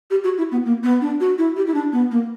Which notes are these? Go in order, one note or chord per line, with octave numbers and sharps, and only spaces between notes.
G4
F#4
E4
B3
A#3
B3
D4
F#4
E4
G4
E4
D4
B3
A#3